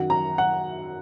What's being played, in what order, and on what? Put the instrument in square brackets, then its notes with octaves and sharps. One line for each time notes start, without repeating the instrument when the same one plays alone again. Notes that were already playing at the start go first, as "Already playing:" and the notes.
Already playing: [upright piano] F#2 D#3 F#3 F#5
A#5
F#5